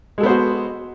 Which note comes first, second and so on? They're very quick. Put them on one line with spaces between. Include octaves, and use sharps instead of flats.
G#3 A4 B3 C5 F#4